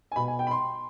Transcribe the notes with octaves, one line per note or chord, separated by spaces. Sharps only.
G#5
B2 B5
G#5
G5
B5
C6